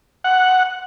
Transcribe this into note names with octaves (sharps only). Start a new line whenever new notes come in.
F#5